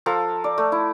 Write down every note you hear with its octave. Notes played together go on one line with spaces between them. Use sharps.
F3 A4 A#5
D5
A3
E4